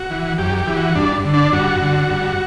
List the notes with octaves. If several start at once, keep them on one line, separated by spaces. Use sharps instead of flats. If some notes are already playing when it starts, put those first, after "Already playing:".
Already playing: F#4
E3
F#2 G4
G4
E3
F#4
G2 D4
D3
D4
G2 F#4
D3
G2